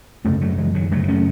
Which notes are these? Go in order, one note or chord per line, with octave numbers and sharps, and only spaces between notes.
F#2 C#3 A3 C#4
F#3 A3
E3 G#3
D#3 F#3
F#2 C#3 F#3 A3
A3 C#4